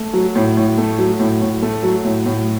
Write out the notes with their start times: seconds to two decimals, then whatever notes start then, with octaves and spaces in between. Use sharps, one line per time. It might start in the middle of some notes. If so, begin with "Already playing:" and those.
Already playing: A3
0.13 F#3
0.36 A2
0.57 A2
0.78 A3
0.98 F#3
1.20 A2
1.41 A2
1.62 A3
1.83 F#3
2.04 A2
2.26 A2